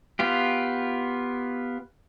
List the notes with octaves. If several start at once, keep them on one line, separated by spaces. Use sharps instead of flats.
B3 F4 G4